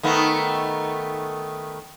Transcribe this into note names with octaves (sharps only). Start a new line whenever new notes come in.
D#3 A3 B3